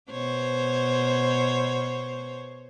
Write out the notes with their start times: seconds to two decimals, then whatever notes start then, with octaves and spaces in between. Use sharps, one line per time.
0.11 B2 C5 C#5